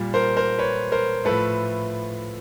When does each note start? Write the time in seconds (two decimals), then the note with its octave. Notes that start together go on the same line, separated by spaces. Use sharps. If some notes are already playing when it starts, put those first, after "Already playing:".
Already playing: A#2 G3
0.14 A#4 C5
0.37 A#4 C5
0.58 B4 C#5
0.92 A#4 C5
1.25 A2 F3 A3 A4 B4